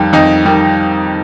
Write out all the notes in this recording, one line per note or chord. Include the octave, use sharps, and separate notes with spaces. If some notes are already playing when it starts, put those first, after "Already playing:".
Already playing: F2 D#3 G3
F2 D#4
D#3 G3